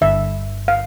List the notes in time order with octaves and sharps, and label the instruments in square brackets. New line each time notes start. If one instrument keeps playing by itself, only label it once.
[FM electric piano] G1 G2 D3 [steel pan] E5
[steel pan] F5